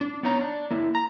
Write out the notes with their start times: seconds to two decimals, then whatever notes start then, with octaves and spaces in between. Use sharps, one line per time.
0.01 D4
0.23 B3 D#4 C#5 A#5
0.41 D4
0.71 A#3 E4
0.95 A#5